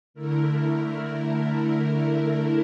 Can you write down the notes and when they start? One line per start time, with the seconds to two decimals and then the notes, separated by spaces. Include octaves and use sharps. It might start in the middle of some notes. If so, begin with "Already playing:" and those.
0.14 D3 A3 E4 A#4